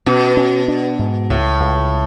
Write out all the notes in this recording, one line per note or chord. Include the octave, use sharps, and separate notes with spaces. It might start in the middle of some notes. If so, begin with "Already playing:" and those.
B2 C#4
C#4
D4
G#2
C#2 A2
C#2